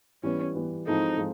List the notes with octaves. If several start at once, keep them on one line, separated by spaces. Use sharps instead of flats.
E3 G3 B3 C#4
E3 G3 B3
F3 G#3 C4 D#4 E4 A4
F3 G#3